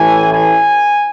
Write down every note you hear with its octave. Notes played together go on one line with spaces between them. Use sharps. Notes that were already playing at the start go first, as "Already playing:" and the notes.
Already playing: A1 A2 E3 G#5
G#5